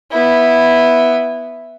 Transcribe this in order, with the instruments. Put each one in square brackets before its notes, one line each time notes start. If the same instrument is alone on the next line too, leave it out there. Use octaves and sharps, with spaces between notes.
[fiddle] B3 E4